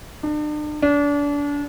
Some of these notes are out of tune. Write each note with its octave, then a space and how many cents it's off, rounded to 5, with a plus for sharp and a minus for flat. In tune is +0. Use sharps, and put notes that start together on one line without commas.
D4 +40
D4 -30